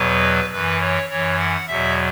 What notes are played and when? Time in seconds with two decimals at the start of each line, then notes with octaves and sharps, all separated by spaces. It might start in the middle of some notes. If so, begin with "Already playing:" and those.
Already playing: E2 B2 F#3 B4
0.52 F#2 E3 B4
0.81 C#5
1.10 F#2 E3 C#5
1.39 F#5
1.68 E2 B2 F#3 E5